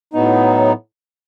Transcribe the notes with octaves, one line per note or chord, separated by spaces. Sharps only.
A2 F#3 B3 D#4